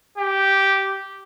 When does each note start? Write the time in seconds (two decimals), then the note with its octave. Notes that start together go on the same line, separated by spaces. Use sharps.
0.18 G4